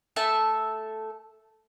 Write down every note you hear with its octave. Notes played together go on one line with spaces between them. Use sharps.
A3 A4 E5 A5